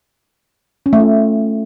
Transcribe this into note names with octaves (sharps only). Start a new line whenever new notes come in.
C#4
A3
F4